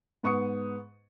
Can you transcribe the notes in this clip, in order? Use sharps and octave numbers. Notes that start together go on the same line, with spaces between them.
G#2 B3 C#6 D#6 C#7